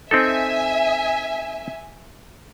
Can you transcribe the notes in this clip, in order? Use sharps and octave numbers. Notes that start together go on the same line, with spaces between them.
C4 D#4 A4 E5 G#5